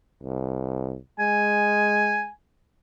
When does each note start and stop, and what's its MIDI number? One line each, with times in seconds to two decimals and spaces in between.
0.23 0.97 36
1.19 2.28 56
1.19 2.27 80